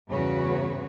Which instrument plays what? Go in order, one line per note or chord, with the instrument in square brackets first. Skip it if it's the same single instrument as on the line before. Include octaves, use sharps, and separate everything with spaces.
[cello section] E2 G2 C#3 F#4 B4 C#5